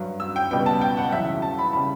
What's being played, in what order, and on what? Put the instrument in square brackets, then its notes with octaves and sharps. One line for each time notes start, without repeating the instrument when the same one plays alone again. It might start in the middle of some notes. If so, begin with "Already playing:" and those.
Already playing: [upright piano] G2 F#3
E6
G5
C#2 B2 G3 G5
A5
G5
F#5
E2 C#3 F#3 E5
A5
B5
C#3 G3 B5